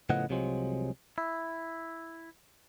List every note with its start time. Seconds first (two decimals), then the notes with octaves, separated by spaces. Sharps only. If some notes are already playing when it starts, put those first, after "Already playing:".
0.10 A2 C#3 F3 B3 D#5 F#5
0.29 C2 C3 F3 F#3 G#3
1.18 E4